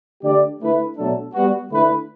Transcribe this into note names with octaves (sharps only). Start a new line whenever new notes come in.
D3 A3 D4 G4 D5
D3 A3 E4 B4
B2 F#3 A3 D4 A4
G3 B3 F#4
D3 A3 E4 B4